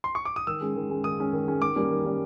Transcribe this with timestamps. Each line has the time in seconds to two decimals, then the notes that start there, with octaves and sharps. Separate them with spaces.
0.04 C6
0.15 C#6
0.25 D6
0.36 D#6
0.47 D#3 E6
0.61 G#3 C#4
0.76 D#3
0.90 G#3 C#4
1.04 D#3 D#6
1.19 G#3 C#4
1.33 D#3
1.47 G#3 C#4
1.61 D#3 D6
1.76 G3 A#3 C#4
1.91 D#3
2.05 G3 A#3 C#4